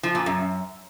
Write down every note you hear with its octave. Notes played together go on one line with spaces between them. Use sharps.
F3
A#2
F#2